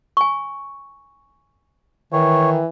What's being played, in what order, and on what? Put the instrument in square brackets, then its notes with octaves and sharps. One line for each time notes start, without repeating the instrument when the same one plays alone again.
[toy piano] G#5 C#6
[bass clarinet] D#3 [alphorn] E3 [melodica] C#5